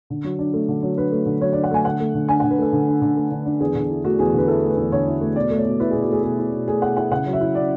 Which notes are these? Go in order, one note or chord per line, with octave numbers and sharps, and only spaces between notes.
D3
F#3
D4
A3
D3
F#3
D4 B4
A3
D3
F#3 C#5
D4 D5
F#5
A3 G#5
D3 F#5
A3
D3
D4 G#5
D3 F#5
B4
A3 A4
D3
D4
D3
A3
D3
D4
E2 G#4
D3
E4
A3 F#4
E2 G#4
D3 B4
E4 A4
A3
B4
E2
D3 C#5
E4
A3
B2 D5
A3
C#5
B2
E4 B4
B2 G#4
F#4
A3 G#4
B2 G#4
E4
B2
A3 G#4
B2 F#5
E4 F#5
C#3 F#5
F#3
E5
E4
C#4 D5